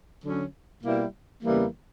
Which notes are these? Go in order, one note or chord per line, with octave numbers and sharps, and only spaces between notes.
D3 F#3 C#4
B2 G3 A#3 E4
E2 C#3 E3 G3 A#3